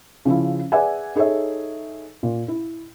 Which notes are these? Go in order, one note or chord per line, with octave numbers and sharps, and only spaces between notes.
C#3 F3 C#4 E4
G#4 B4 D5 E5 F#5 G#5
D#4 G#4 A4 C#5 E5
A#2
E4